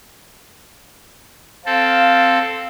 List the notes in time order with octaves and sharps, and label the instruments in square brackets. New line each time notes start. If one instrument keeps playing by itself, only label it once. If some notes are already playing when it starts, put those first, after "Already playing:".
[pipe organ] C4 A4 [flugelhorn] F5